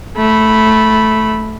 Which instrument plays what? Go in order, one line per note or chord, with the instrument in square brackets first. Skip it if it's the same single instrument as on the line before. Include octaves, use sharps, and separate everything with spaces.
[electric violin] A3 B5